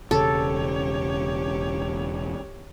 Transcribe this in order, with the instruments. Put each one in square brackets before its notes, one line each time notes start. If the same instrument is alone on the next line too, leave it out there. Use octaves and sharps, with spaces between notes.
[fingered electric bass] E1 C#3 [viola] G4 C#5 [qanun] A4